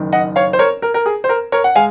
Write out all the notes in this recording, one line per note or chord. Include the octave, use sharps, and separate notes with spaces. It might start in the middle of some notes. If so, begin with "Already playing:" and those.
Already playing: F#1 F#2 D#3
D#5 F#5
C#5 F5
C5
A#4 C#5
A#4
A#4
G#4
C5
A#4
A#4 C#5
F#5
G#3 F5 G#5